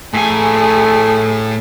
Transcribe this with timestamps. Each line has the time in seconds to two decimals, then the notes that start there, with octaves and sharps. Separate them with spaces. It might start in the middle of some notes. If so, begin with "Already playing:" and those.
0.14 A2 A3 G#4 G#5